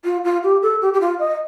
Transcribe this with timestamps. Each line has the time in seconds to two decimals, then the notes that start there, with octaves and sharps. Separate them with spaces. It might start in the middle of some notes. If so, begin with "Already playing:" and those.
0.04 F4
0.24 F4
0.43 G4
0.62 A4
0.81 G4
0.93 G4
1.00 F4
1.19 D#5